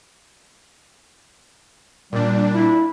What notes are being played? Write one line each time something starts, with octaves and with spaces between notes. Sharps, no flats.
A#2 G3 D4
E4